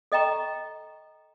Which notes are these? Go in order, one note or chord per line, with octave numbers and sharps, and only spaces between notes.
A4 D#5 G5 A#5 C#6